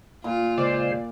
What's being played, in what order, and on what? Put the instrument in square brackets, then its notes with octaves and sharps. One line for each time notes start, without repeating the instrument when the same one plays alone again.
[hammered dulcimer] A#2 [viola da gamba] F4
[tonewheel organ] C#3 G#3 C5 [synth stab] D5